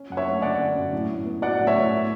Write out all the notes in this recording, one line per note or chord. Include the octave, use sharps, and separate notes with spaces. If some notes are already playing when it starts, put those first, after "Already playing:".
Already playing: C#4
F#2 F#5
C#5 E5
A3
D3 D5 F#5
C#4
F#2
A2
A2
B3
F#3 D5 F#5
A2
C#5 E5
A2
A3